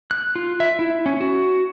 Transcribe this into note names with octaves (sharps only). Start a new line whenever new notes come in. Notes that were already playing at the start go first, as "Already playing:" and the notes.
F#6
F4
E5
E4
C#4
F#4